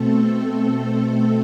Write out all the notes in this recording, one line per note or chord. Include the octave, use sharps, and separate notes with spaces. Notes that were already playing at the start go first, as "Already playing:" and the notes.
Already playing: B2 A3 C4 A4